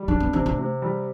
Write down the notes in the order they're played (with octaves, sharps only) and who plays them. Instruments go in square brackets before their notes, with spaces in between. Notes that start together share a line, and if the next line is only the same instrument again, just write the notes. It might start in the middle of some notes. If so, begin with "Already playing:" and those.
Already playing: [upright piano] G3
[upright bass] F#3 [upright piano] D4
[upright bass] B3
[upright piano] C3 [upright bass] C4
[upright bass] A3
[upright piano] C3
G3